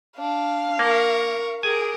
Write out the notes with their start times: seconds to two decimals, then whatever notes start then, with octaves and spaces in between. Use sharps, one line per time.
0.18 D4 F5
0.79 A#3 A#4 C#6
1.63 G4 G#4 A#4 G#5